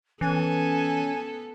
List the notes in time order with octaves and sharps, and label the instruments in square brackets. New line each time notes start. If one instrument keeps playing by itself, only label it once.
[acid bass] E3 [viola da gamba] B3 A4 [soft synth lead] C#4 [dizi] G#5